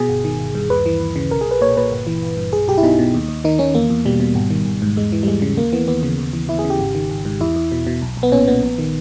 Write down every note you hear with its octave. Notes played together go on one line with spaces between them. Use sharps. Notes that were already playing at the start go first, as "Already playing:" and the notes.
Already playing: B2 G#4
G1
D#3
G1
G2
D#2 B4
E3
D#2
C#3
B1 A#4
G#4
B1 B4
A#2 C#5
A#2 B4
G1
E3
G1
G2
B1 G#4
B1 G4
E4
B2 D#4
B2
D#2
D#2
D#3 D#4
D#3 C#4
E2 A#3
E2
B2 G3
B2
G#1
D#3
G#1
G#2
E2 G#3
E3
G3
E2 G#3
C#3
D#2 A#3
E3 B3
D#2 B3
C#3
D#2
E3
D#2 E4
G#4
C#3
G4
G#1
D#3
G#1
G#2
E2 E4
E2
B2
B2
B1
B1
B3
A#2 C#4
A#2 B3
A#1
D#3